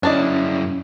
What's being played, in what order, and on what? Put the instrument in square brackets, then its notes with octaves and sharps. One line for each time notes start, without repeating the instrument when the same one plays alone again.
[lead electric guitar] F#2 E4 [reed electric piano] C#4 [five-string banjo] D4 D5 D#5